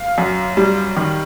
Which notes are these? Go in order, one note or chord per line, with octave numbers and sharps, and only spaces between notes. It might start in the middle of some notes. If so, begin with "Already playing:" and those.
Already playing: F5
F#2
G3
D#3